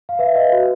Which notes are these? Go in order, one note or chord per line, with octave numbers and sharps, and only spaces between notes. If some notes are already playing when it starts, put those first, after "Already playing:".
F5
B4 E5
B4 D#5 F5
F#4